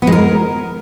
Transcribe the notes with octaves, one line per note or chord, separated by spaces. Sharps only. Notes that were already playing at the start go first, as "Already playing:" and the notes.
B3
G#3
A#4